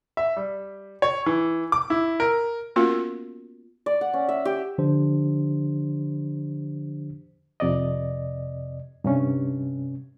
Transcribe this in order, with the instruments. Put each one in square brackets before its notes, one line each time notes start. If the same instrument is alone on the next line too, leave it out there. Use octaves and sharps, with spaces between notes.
[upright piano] E5
G3
C#5
E3
D6
E4
A#4
[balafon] A#3 B3 C#4 F4 F#4 A#4
[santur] D5
F#5
C#4
E5
G4
[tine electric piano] D3 F3 D4 G4 C5
[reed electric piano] F2 C3 D5 D#5
G2 C3 C#4